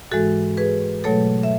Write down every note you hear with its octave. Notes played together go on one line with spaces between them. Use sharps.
G#2 E3 G#3 F#4 A4
G#4 B4
B2 F#3 A3 A4 C#5
E5